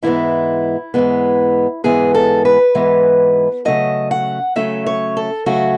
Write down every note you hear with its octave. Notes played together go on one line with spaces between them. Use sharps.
G#2 E3 G#3 B3 E4
G#2 E3 G#3 B3
G#2 E3 G#3 B3 G#4
A4
B4
G#2 E3 G#3 B3
C#3 F#3 A3 C#4 D#5
F#5
C#3 F#3 A3 C#4 E5
C#5
A4
C#3 F#3 A3 C#4 F#4